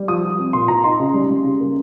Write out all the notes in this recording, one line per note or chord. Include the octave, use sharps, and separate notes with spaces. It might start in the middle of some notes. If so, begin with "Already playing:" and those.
Already playing: G3
F3 D#6
F3
C4
A#2 C6
A#2 A#5
D#4 C6
C#3
G3
G3
C#3
A#3